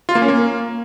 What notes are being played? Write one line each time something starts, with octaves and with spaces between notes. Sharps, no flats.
F4
A#3
C#4
A#3